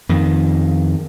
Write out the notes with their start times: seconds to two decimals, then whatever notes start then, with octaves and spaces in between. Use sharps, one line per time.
0.09 F2 D#3